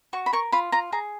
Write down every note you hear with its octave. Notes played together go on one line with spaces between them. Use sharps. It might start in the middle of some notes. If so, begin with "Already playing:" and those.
F#4 C#6
B5
A#4 C#6
F4 B5
F4 A#5
G#4 A#5